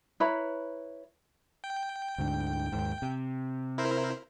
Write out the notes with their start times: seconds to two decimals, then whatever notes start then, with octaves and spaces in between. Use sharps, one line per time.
0.20 E4 B4 C#5 A#5
1.64 G5
2.18 D2 G#2 D3
2.72 D#2 G#2
3.02 C3
3.78 E4 A#4 C5